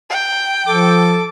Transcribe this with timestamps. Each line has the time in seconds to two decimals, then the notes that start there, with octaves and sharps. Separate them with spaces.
0.10 G5
0.67 F3 A4 D6